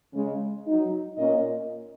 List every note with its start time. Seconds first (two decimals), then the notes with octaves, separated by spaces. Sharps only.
0.13 C#3 G#3 C#4
0.65 F#3 D#4
1.17 A#2 A#3 C#4 A#4 D#5